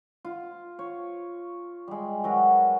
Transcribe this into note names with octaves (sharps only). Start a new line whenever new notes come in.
F4
C#5
G3 G#3
F#3 A#4 B4